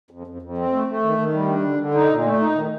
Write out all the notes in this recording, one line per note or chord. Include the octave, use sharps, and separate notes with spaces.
F2
F2
F2
C4
A3
A3
D#3
D#3
G3
D4
D3
D3
D#4
A#2
A3
D#4
D#3